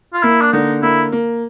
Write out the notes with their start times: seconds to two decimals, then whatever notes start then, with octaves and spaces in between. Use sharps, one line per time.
0.13 F4
0.23 A#3 E4
0.41 D4
0.53 D3 D#4
0.83 A#3 E4
1.12 A#3